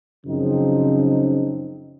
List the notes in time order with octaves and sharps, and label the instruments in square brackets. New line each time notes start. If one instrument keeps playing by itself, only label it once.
[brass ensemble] F#2 C#3 F3 C4 D#4